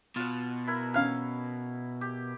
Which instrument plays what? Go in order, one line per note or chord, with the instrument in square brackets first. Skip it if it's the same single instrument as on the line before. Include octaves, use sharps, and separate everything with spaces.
[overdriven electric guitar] B2 [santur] F4 F#5
[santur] E4 A#4 F#5
[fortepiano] C#4 F5 F6
[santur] G4